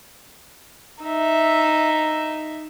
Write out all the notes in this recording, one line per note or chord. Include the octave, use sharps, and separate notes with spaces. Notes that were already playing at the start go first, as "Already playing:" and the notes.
D#4 E5